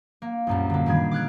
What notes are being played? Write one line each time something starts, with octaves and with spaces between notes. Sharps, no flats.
A#3
C2 F#2 A#2
D3 A#3
A#2 D#3 G3 G#4 G#6
D6 F6 F#6 G#6